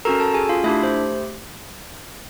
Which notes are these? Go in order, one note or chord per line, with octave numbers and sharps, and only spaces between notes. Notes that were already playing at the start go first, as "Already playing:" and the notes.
C#4 F#4 A4 A#4 A#5
A4 A5
G#4 G#5
F4 F5
A3 D4 E4 G4 E5
C5